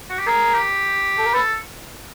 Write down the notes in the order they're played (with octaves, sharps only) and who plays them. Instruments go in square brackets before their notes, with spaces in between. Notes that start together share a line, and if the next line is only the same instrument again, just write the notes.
[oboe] F#4
G4
[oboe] G#4 [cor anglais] A#4
[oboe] G4
[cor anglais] A4
A#4
[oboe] A4 [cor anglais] B4